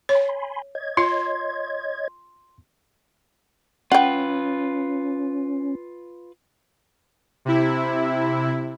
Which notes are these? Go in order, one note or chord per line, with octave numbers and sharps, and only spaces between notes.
C#5 G#5 B5 C6
C#5 D#5 G#6
F4 C6
C#4 F4 B4 F#5 G5
C3 E4